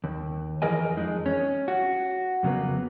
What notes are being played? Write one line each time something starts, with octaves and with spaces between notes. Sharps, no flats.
D#2
F2 E3 G#4 A#4 D#5 G#5
F2 G#3 D#4
C#4
F#4
F2 C#3 F#3 A#3 B3